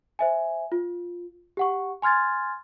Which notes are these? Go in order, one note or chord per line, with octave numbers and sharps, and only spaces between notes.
C5 E5 G#5
F4
G4 F#5 C#6
G#5 C6 F6 G#6 A6